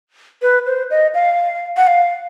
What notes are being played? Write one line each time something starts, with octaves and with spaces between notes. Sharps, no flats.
B4
C5
D#5
F5
F#5
F5